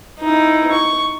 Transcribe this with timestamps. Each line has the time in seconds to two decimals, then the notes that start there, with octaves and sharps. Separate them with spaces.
0.20 D#4 E4
0.71 C#6